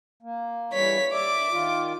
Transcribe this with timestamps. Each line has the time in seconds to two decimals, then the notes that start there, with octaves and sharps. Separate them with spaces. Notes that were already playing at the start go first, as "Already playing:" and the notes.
0.23 A#3
0.73 E3 G3 C#5 B6
1.13 D5 E5 D6
1.52 D#3 F4